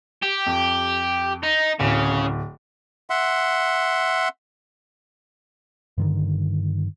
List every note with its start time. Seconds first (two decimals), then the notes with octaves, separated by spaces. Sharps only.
0.23 G4
0.46 F2
1.43 D#4
1.80 D1 C#3
3.10 E5 F#5 C6
5.98 G2 D3 D#3